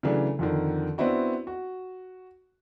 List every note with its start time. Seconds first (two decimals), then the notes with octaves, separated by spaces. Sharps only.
0.03 C#3 E3 F#3 A3 D4
0.39 F2 D3 D#3
0.98 B3 C4 D4 E4 F#4
1.47 F#4